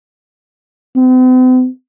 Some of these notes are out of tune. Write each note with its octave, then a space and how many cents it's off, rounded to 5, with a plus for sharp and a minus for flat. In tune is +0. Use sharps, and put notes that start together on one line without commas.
C4 -45